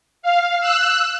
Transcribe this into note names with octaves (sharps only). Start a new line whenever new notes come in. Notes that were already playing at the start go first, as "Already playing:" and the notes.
F5
E6 F#6